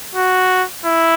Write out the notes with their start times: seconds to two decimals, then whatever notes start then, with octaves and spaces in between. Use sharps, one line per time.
0.15 F#4
0.85 E4